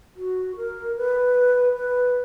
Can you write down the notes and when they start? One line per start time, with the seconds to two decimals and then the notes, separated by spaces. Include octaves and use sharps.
0.16 F#4
0.57 A#4
0.97 B4
1.76 B4